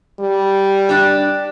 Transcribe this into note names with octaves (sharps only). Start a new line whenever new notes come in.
G3
D4 G4